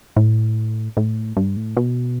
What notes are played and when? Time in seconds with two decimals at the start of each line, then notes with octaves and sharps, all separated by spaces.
0.16 A2
0.97 A2
1.37 G2
1.57 A2
1.77 B2